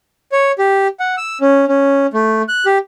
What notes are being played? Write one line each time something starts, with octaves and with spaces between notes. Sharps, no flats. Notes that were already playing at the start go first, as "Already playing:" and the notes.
C#5
G4
F#5
E6
C#4
C#4
A3
F#6
G4